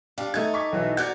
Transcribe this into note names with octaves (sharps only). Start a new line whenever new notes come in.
G3 D4 F5
A3 D#4 A4 G#6
C#6 D6 B6
B1 E3 E4
F#4 A#4 D5 G6 G#6